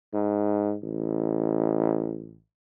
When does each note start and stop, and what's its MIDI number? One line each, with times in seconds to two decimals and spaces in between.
0.14 0.75 44
0.84 2.40 33